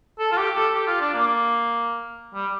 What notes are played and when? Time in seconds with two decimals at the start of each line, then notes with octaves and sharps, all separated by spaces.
0.19 A4
0.32 F4
0.37 G4
0.56 A4
0.74 G4
0.87 F4
1.01 D4
1.14 A#3
2.34 G3